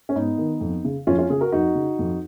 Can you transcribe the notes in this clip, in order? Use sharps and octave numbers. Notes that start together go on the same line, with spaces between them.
C#4
G#2 B3 D#4
D#3
F2
C#3
F2 C#4 F4
C#4 F4
C#3 F4 G#4
F#4 A#4
F2 D#4 F#4
C#3
F2